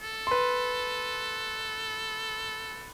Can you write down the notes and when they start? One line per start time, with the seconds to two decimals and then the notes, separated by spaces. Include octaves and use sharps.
0.01 A4
0.27 B4 C6